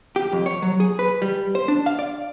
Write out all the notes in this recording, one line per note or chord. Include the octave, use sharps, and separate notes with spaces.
G4
F2
C#5
F#3
G#4
B4
G3
C5
D4
F5
D5